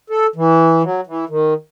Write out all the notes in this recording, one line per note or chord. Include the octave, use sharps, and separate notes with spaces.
A4
E3
F#3
E3
D#3